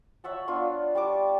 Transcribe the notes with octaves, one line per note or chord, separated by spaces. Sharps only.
C#5 E5 F#5 A5
B3 D4 F4
G3 A5 C#6 D6